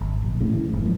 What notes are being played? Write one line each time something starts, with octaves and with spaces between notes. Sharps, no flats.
G#1
D1 A#1
A2 C#3
E3
F#1 B1 G#2
F3 A#3